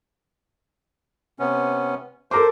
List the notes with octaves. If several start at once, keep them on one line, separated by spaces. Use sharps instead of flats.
C3 B3 C#4
A4 A#4 C5 D6